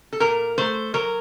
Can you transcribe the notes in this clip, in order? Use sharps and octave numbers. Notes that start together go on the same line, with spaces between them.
A4
A#2 A#4
A3 C5
F#3 A#4